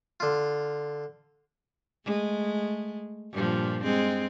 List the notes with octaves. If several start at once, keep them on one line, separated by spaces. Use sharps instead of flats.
D3 F4
G#3 A3
G2 A#2 F3
G#3 C4